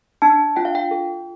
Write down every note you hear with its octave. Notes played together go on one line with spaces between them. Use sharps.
D4 A5
F4 G5
F5
G5
A4